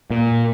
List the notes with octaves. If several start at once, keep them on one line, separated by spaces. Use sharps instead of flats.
A#2